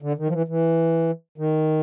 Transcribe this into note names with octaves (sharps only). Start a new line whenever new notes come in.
D3
D#3
F3
E3
E3
D#3